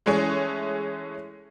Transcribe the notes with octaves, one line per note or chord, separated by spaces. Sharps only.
E3 G#3 A3 C#4 G#4 C#5